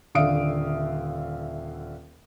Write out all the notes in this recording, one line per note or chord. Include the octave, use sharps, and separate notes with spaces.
D#1 D3 E5 F5 D#6 D7